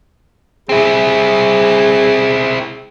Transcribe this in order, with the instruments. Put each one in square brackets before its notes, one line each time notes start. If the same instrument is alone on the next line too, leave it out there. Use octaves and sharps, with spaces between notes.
[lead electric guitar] C4 E4 [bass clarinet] G#4